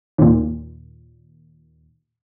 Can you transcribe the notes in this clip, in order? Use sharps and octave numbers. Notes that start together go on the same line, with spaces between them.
D#2 A#2